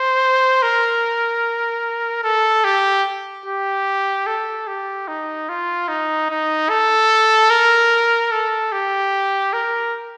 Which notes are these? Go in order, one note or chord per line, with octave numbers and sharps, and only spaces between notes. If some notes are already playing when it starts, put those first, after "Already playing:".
Already playing: C5
A#4
A4
G4
G4
A4
G4
D#4
F4
D#4
D#4
A4
A#4
A4
G4
A#4